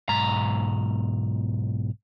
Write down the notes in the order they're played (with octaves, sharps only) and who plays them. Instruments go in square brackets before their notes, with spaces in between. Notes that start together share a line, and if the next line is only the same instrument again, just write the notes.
[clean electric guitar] B1 G#2 A#5